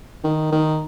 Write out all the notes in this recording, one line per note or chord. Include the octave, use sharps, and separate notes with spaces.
D#3
D#3